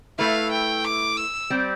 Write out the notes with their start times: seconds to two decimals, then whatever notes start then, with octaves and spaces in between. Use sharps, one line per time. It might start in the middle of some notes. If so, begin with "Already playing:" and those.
0.19 A3 E4 B4 F5
0.51 G5
0.84 D6
1.17 E6
1.50 G3 C4 G4